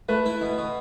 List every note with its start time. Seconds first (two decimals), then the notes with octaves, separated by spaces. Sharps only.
0.09 A3 B4
0.26 E4
0.41 B2
0.58 B2